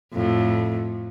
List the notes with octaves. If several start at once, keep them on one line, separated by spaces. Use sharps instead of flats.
F2 A2